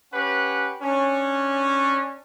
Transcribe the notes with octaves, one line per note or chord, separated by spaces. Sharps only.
C#4 G4 B4 F#5
C#4 D4